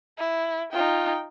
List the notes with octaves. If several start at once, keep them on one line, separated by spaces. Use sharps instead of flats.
E4
D#4 F4 G5